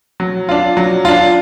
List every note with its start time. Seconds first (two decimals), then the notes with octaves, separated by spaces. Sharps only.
0.20 F#3
0.49 D4 F4
0.77 F#3
1.05 D4 F4